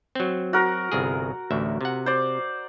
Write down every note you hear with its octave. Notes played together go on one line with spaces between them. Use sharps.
F#3 C4
F#4 A#4
G1 C2 G#4
A1 D2 E5
C3 F#5
C5 D5